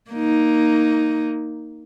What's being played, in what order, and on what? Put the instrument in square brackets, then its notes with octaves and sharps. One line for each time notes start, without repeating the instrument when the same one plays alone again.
[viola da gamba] A#3 D#4